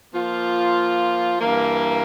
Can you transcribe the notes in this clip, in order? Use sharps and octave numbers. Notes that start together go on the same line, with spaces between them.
F3 A#3 F4
G2 E3 A#3